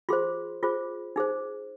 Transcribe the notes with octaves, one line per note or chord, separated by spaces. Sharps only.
F4 G#4 C5 C6
F4 G#4 C5
D#4 G#4 C5